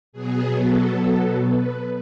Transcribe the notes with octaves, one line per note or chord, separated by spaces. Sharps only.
B2 F#3 B3 G#4
A4
B4